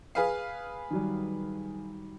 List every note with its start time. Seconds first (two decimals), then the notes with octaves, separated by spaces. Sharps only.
0.15 G#4 B4 F5
0.91 D#3 F#3 G3